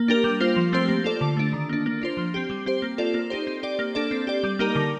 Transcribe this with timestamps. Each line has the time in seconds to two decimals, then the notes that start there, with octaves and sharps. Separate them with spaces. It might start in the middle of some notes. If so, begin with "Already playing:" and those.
Already playing: A#3
0.08 D4 G4 A#4
0.24 G3
0.40 A#3 F4 C5
0.56 F3
0.73 A3 C4 G4 C5
0.89 A#3
1.04 F4 A4 D5
1.21 D3
1.37 A3 D4
1.53 D#3
1.69 A#3 D4
1.86 A#3
2.02 D4 F4 C5
2.17 F3
2.34 C4 G4
2.50 G3
2.66 C4 G4 C5
2.82 A#3
2.98 F4 A4 D5
3.14 A#3
3.30 D#4 G4 C5
3.47 C4
3.63 G4 D5
3.79 A#3
3.95 D4 A4 D5
4.11 C4
4.27 G4 D5
4.44 G3
4.59 A#3 D#4 G4 A#4
4.76 D3